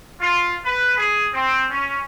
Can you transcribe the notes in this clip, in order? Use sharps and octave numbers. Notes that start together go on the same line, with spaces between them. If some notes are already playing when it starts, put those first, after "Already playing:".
F4
B4
G#4
C4
C#4